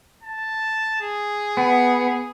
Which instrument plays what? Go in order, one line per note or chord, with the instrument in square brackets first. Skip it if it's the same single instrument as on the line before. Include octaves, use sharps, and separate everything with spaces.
[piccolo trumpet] A5
G#4
[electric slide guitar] B3